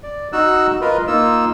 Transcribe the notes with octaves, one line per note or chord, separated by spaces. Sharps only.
D5
D#4 F#4 E6 F#6
F4 A#4 B4 D#5
A#3 D#4 F4 E6